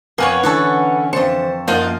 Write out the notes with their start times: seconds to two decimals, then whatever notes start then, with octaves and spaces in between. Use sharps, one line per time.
0.18 F2 A#3 B3 B4 C#5 G#5
0.43 D3 E3 C#4 A4 C#5 F#5
1.13 F2 C5 A5 C#6
1.68 F#2 F3 A#3 D#4 F4 F#5 F6